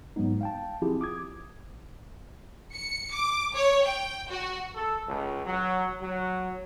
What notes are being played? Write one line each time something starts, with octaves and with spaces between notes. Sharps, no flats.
G#2 F#3 G#3 B3 D#4
F5 G5 A5
F3 C4 E4 F4 G4 G#4
D6 D#6 G#6
C#7
D6
C#5
G5
F#4
A4
C#2
F#3
F#3